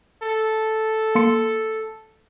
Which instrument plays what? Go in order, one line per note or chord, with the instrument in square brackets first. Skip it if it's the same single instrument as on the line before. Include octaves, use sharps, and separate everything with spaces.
[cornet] A4
[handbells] A#3 C6 C#7